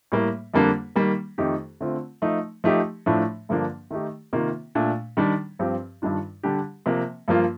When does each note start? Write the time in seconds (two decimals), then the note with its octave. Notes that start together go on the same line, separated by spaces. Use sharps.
0.12 A2 G3 A#3
0.54 F2 D3 G3 A#3 D4
0.96 D#3 G3 A#3
1.38 F2 D#3 A3 D#4 G4
1.81 D3 A3 C4 F4
2.22 F3 A3 D#4
2.64 F3 A3 D#4 G4
3.06 A2 F3 A3 D4
3.49 G2 D3 F3 A#3 D4
3.91 D#3 A3 D#4 G4
4.33 C3 D#3 A#3 F4
4.75 A#2 A3 D4
5.17 D#3 G3 D4
5.59 G2 F3 C4 G4
6.02 G2 D#3 G3 D4 F4
6.43 D3 G3 D4 G4
6.86 C3 F3 A#3
7.28 G2 F3 A#3 F4